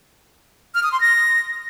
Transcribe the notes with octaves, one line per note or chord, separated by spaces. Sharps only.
F6
D#6
C6
A#6